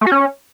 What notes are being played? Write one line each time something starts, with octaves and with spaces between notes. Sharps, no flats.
A3
F#4
C#4